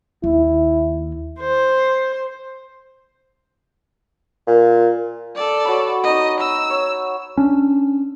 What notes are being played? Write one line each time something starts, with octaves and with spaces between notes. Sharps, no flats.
D#2 E4
C5
A#2
A4 D5
F#4 C#5 B5
B3 D#4 D#5
E6
C#5
C#4 D4